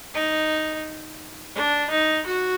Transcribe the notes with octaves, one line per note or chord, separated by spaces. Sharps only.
D#4
D4
D#4
F#4